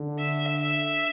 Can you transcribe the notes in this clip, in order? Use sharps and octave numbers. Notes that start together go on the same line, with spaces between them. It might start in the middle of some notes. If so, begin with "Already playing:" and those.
Already playing: D3
E5
E5